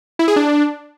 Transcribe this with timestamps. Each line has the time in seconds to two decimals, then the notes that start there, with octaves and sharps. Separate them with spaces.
0.19 E4
0.28 G#4
0.36 D4